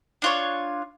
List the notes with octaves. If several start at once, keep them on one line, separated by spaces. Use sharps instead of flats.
D4 F4 C#5